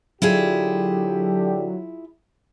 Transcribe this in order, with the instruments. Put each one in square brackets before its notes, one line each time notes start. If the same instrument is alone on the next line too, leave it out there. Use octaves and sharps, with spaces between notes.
[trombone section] D3 G4 [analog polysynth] F#3 [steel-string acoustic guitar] E4 F4 G#4